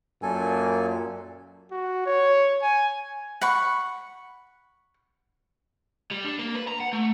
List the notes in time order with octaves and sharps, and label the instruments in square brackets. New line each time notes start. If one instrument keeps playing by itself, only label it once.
[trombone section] F#2 A#2 [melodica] A4 G#5
[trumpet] F#4
C#5
G#5
[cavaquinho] F#5 B5 C#6
[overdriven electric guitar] G3
D4
A#3
B4
A#5
F#5
A3